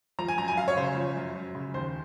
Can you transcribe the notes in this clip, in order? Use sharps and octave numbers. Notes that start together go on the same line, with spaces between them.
F3 A#5
G#5
F#2 A#5
G#5
F#2 F5
C#5
C#3 C5
F3
F#2
F#2
C#3
D#2 C5